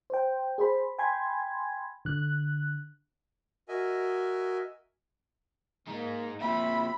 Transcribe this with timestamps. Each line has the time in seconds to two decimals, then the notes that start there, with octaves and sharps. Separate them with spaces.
0.10 C5 G5
0.58 G#4 C5 B5
0.98 G5 G#5 B5 C6 G#6
2.05 D3 F#6
3.68 F#4 A#4 D#5 E5 G#5
5.87 G#3 A#3 D#4
6.41 A#2 C4 E5 B5